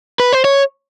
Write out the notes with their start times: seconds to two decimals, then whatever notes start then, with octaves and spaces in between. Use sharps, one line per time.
0.20 B4
0.33 C5
0.44 C#5